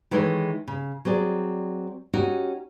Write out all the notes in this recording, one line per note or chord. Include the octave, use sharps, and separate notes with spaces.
D#3 E3 G#3 A3 E4 C#5
C#3
F#3 C4 G#4 D5
C#4 D#4 F#4 G4